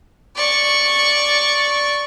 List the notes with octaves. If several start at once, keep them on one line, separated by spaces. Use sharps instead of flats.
D5 C#6